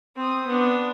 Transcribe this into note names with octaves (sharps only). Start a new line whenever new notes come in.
C4 D#6
B3 D4